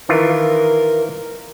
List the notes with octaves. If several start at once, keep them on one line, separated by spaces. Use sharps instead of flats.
D#3 E3 F4 A#4